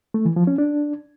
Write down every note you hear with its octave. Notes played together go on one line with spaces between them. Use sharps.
A3
E3
F3
C#4
D4